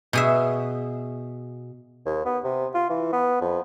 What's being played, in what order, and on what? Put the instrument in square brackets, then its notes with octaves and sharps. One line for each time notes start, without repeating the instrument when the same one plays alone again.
[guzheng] B2 G#4 E5
[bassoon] D#2
B3
C3
F4
E3
B3
F2